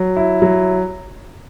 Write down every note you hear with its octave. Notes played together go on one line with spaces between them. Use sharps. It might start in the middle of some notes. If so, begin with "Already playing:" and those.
Already playing: F#3
E4
F#3